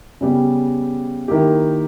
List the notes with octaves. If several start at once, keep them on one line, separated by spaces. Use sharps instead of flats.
C#3 G3 B3 G4
D#3 A#3 E4 G4